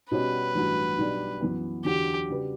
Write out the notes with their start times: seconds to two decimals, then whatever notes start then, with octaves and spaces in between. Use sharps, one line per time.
0.11 B2 G3 C#4 F#4 B4
0.55 A1 G2 F#3
0.98 B1 B2 G3 D4
1.41 F#2 E3 B3
1.85 E2 D3 F#3 G4
2.30 C#3 G3 D4 F#4 B4